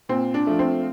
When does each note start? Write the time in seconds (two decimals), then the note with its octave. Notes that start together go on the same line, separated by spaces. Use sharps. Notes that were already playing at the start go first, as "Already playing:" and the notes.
0.09 A#2 C4
0.34 D4
0.47 F3 A3
0.59 C4